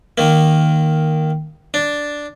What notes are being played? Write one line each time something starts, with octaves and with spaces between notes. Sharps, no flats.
D#3 A#3
D4